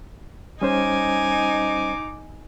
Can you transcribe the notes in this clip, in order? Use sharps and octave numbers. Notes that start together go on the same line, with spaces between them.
G3 C#4 D#4 C5 G#5 D6